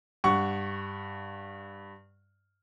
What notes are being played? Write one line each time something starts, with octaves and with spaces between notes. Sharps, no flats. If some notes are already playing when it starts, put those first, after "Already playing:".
G2 F#5 C#6